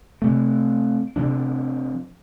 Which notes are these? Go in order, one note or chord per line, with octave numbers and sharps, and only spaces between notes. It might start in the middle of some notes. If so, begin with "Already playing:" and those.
C3 A3 C4
C3 F3 D4